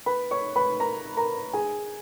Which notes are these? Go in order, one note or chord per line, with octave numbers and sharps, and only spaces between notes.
B4 B5
C#5 C#6
B4 B5
A#4 A#5
A#4 A#5
G#4 G#5